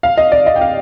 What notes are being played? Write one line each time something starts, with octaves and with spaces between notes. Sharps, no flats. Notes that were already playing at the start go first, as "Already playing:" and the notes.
F5
D#5
D5
D#5
G5
F5